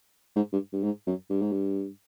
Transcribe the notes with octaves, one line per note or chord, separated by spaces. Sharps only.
G#2
G2
G2
G#2
F#2
G2
G#2
G2